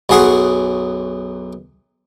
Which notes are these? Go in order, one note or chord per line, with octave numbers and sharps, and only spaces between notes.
B1 F#2 G#4 F#5 C6 C#6